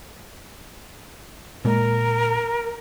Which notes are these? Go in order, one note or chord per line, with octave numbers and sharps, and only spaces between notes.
A#2 G#3 A#3 A#4